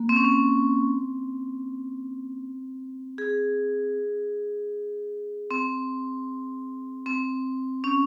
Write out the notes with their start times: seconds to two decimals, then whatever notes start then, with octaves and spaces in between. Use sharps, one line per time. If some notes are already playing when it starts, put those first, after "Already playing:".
Already playing: A#3
0.09 C4
0.16 C#4
0.24 C4
3.18 G#4
5.51 C4
7.06 C4
7.84 C#4